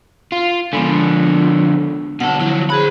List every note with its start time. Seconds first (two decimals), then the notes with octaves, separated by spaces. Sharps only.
0.32 F4
0.73 D3 F3 G#3 B3 D4
2.20 B2 D3 A4 F#5
2.40 F3 F#3 E4
2.70 G#4 C5 B5 F#6